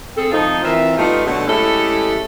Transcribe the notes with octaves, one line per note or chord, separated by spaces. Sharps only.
C4 G#4 A4
F3 A3 C4 D#4
E3 C4 F4 A#4 E5
G3 A3 B3 D#4 F4
B2 D3 F#3 A3
G#3 A3 C#4 E4 G4 A4